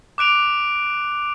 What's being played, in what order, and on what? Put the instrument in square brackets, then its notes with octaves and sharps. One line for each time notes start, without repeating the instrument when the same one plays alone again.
[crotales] D6 F#6 D7 F7